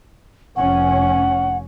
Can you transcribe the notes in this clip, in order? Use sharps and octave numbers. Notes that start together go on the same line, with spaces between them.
F1 C#4 F#5